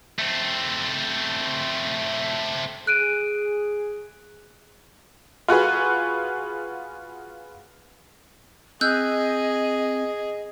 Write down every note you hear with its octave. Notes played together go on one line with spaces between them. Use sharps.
A3 C4
G#4 F#6 D7 D#7
F4 F#4 G#4 B4
C4 G#4 D#5 E6 F#6 G6